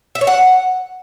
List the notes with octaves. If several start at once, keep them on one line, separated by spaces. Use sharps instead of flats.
E5
C#5
F#5